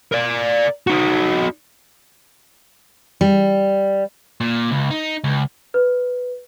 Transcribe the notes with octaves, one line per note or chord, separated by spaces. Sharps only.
A#4 D5
D#4 F#4
G3
A#2
C#2
D#4
C#2
B4